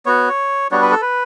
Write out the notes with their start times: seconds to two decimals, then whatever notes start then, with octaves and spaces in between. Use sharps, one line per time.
0.06 B3 F#4 C#5
0.72 G3 B3 D4 F#4 C#5
0.82 B4
0.91 A4
1.01 B4